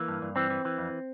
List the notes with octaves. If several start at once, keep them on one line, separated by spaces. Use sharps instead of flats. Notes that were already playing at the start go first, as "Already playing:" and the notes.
Already playing: E3 A#3
G2
G2
E3 C4
E3
E3
F2